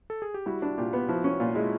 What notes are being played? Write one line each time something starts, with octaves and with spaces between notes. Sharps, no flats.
A4
G#4
G4
G3 E4 F#4
D4
A#2 F4 G4
B3
F3 E4 F#4
C#4
A#2 F4
G#3 E4